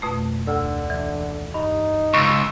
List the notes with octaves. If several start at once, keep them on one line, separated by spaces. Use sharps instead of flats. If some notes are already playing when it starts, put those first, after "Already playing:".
F2 B2 A3
D2 D3 E6
E3
G2 D#4
C#2 C#6 E6